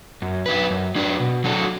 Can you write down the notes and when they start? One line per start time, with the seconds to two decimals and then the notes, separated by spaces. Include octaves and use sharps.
0.22 F#2
0.46 F#3 D4 B4
0.71 F#2
0.95 F#3 D4 B4
1.20 B2
1.44 F#3 D4 F#4 A4